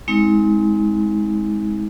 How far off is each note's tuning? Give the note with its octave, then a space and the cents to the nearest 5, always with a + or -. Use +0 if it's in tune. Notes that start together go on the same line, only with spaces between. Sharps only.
G#3 +0 C4 +0 D#4 +40